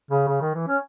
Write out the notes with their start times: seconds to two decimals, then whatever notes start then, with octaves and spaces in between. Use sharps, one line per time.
0.11 C#3
0.28 C#3
0.42 D#3
0.55 E3
0.68 C#4